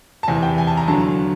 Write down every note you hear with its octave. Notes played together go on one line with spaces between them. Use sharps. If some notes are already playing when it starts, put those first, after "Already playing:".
A5
E2 C3 E3 G#5
G5
G#5
A5
A#5
D#2 D3 F#3 A5